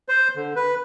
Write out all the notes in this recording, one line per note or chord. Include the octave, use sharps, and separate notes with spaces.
C5
D3
B4